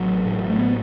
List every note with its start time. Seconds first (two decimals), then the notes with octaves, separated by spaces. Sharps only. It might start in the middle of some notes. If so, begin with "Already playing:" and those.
Already playing: A1 F#3
0.25 A1 A2
0.50 A3
0.59 B3